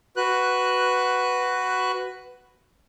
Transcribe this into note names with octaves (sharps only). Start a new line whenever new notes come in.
F#4 B4 F#6